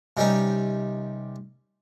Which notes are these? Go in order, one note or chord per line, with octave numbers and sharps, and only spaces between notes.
C3 D#3 G3 C#4 D#4